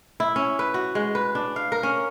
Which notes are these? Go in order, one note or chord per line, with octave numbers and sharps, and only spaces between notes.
E4
C#4
B4
F#4
G#3
B4
D4
F5
A#4
C#4